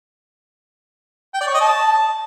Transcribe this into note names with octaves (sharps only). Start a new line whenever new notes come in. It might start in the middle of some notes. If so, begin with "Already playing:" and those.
G5
D5
C#5
D#5
A5